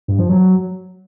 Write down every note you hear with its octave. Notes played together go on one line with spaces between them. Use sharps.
G2
F3
F#3